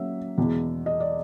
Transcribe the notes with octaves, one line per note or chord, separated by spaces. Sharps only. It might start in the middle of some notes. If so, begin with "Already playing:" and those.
Already playing: F#3 A#3 C#4 E5
E2 B2 G#3
D#5
D5